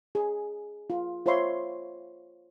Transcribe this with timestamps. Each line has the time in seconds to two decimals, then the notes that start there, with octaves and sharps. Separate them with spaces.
0.15 G#4
0.90 F4
1.26 F4 C5 C#5 E5 B5 C6